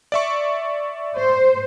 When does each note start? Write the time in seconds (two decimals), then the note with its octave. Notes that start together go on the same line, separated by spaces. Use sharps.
0.12 D5 E5 C#6
1.18 C5